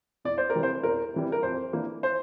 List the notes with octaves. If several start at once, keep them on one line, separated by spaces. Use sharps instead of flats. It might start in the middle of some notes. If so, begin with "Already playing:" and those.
E2 D5
C5
A#4
C3 E3 G3
C5
E2 A#4
C3 E3 G3
A#4
F2 C5
E3 A#3 D4
C5